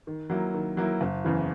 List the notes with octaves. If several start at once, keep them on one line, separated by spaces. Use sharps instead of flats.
D#3
F#3 A#3 E4
D#3
F#3 A#3 E4
F#1
E2 C#3 E3